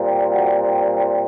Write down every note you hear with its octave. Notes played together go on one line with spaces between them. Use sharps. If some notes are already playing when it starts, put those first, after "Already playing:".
Already playing: A#2 G3 C4
F#4